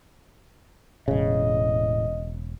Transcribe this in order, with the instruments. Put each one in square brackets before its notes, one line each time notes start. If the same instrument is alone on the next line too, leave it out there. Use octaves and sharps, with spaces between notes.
[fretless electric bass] E1 C#3 [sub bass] A2 [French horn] D#5